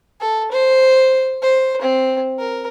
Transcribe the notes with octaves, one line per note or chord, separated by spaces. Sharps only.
A4
C5
C5
C4
A#4